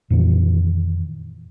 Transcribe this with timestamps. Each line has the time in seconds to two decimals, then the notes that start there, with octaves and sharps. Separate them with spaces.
0.10 F2 A#2 D#3 E3